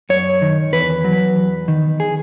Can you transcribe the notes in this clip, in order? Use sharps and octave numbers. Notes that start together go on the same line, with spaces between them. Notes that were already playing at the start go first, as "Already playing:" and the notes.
F#2 C#5
D#3
E2 B4
F#3
E2
D#3
G#4